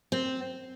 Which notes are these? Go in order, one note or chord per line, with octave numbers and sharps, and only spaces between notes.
C4